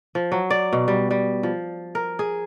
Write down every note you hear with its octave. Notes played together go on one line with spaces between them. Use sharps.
F3
F#3
D5
B2
G3
G3
F3
A#4
G#4